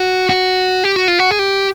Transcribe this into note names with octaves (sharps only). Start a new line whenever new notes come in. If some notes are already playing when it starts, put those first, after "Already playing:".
Already playing: F#4
F#4
G4
F#4
F4
F#4
G#4
G4